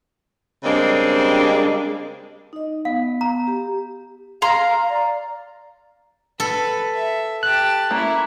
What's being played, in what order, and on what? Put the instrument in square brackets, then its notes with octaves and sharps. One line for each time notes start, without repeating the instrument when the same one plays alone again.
[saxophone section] C#3 G3 G#3 A#3 C4 D4
[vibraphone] D#4 D#5
[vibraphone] B3 [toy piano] F5
[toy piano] A#5
[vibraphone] G4
[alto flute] F5 [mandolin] A#5 C6
[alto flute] D5
[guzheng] A4 [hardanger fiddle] B4
[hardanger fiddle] E5
[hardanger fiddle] G4 A5 [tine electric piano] F#6
[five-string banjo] A#3 [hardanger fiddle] C#4 E4